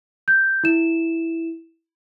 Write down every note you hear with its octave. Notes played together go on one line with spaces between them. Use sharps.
G6
E4 E7